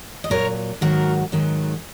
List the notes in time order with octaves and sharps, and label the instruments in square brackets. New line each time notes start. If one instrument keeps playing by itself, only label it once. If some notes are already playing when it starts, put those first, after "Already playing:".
[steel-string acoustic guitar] D#5
A#2 F#3 A#4 C#5
G#2 D#3 F#3 F#4 A#4
G#2 D#3 F#3